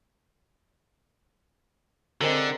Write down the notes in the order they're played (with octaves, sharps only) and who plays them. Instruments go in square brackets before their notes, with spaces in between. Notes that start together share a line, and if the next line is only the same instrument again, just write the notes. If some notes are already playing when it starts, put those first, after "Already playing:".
[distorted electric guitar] D3 [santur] G#3 C4 A#4